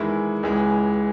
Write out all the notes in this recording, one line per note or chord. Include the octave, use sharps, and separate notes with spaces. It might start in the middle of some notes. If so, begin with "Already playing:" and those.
Already playing: E2 D#3 G#3 E4
C#2 C#3 E3 G#3